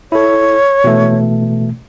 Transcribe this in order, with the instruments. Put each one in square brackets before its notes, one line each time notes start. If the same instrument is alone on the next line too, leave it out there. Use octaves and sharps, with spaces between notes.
[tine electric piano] E4 A4 [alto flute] C#5
[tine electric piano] B2 E3 A3